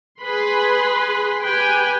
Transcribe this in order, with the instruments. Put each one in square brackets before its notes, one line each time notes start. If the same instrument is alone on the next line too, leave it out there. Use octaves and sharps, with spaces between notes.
[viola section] G#4 B4 B5 C6
G4 B4 G5 G#5